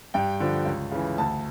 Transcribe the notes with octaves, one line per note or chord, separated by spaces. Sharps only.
G2 G5
D3 F3
C#2
C#3 E3
D2 A5